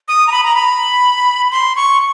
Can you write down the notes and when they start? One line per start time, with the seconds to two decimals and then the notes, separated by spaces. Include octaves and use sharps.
0.08 D#6
0.27 A#5
0.32 B5
0.44 A#5
0.56 B5
1.51 C6
1.76 C#6